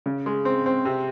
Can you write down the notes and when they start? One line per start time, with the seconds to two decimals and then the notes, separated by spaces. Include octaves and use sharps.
0.06 C#3
0.26 G#3
0.45 C4
0.66 C4
0.85 C3